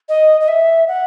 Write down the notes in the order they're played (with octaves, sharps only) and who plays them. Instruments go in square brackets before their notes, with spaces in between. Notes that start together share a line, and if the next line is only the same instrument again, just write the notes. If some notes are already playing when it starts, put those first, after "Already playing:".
[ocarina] D#5
D#5
E5
F#5